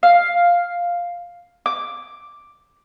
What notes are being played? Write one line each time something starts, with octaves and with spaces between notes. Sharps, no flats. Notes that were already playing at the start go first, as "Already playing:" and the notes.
F5
D6